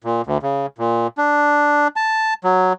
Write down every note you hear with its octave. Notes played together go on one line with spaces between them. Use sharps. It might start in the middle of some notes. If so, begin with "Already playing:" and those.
A#2
D2
C#3
A#2
D4
A5
F#3